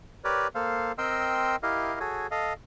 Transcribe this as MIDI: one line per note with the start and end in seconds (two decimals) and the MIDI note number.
0.24 0.48 67
0.24 0.48 70
0.24 0.48 71
0.24 0.48 73
0.24 0.48 74
0.55 0.92 58
0.55 0.92 69
0.55 0.92 72
0.55 0.92 77
0.98 1.56 60
0.98 1.56 70
0.98 1.56 75
0.98 1.56 79
0.98 1.56 84
0.98 1.56 88
1.63 1.99 64
1.63 1.99 67
1.63 1.99 70
1.63 1.99 75
1.63 1.99 77
2.00 2.27 66
2.00 2.27 68
2.00 2.27 69
2.00 2.27 73
2.31 2.53 69
2.31 2.53 75
2.31 2.53 77